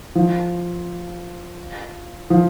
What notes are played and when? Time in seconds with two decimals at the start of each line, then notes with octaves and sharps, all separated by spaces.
0.15 F3
2.30 F3